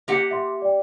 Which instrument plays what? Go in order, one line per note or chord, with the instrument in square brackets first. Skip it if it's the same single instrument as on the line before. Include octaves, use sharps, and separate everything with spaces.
[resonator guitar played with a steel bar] A#3 G4 F#5
[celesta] E5 C6
D5 G5